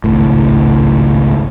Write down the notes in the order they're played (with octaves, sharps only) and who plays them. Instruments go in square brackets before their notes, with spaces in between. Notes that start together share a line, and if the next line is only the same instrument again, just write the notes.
[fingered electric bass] G#1 C#2 A2